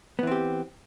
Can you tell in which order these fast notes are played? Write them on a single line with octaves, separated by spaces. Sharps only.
B3 E3 C4 G4